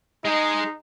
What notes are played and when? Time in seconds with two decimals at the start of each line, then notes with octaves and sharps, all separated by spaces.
0.25 G#3 D#4 G#4